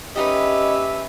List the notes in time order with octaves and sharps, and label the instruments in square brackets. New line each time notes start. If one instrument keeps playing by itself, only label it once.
[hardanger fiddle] C#4 B4 [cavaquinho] D#4 F#4 D#5 [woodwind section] G4 E5